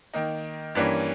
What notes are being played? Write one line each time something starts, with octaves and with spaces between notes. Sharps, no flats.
D#3 A#3 D#4
G2 E3 G3 A#3 C#4